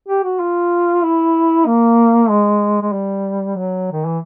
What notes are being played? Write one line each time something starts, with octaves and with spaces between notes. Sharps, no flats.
G4
F#4
F4
E4
A#3
G#3
G#3
G3
F#3
D#3
E3